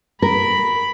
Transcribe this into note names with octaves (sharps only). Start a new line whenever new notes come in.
A#4 B5